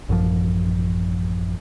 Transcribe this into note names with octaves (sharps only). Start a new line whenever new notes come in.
A1 F#2 F3